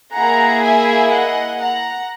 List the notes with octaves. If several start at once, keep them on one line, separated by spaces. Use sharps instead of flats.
A#3 E4 G#4 F#5 A#5
E5 G#5
D#5 F#5
F#5 A#5